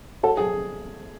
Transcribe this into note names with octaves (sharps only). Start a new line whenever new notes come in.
F#4 A4 C#5 F#5 A5
G#4